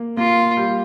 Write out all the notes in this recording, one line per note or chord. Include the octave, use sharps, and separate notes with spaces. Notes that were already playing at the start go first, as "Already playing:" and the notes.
Already playing: A#3
A#3 F4
G3